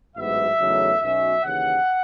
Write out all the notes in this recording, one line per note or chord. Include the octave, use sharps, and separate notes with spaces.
A1 G#2 F#3 B3 E5
E2 C#3 F#3 A3 D#4
B1 B2 F#3 C#4 E5
D#2 C#3 E3 F#5